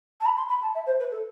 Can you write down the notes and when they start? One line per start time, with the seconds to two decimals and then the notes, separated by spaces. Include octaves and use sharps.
0.20 A5
0.25 B5
0.36 C6
0.48 B5
0.61 A5
0.74 E5
0.86 C5
0.99 B4
1.11 A4